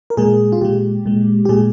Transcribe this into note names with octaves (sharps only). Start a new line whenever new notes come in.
A#4
A#2 G#3 G#4
F4
A#2 G#3 G4
A#2 G#3
G4
A#2 G#3 G#4